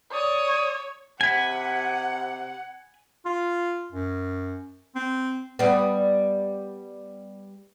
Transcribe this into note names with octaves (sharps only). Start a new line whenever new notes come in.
C#5 D5 D#6
C3 F#5 G#5 B5
F4
F#2
C4
G3 B3